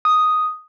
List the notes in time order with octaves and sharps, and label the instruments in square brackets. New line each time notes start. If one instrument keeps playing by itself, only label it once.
[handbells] D#6